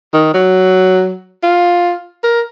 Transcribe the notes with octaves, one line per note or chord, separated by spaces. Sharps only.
D#3
F#3
F4
A#4